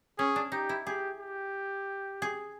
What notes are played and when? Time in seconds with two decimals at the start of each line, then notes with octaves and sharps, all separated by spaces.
0.18 C#4 G#4
0.36 D4
0.52 D#4 G4
0.69 E4
0.86 G4 G#4
1.20 G4
2.22 G#4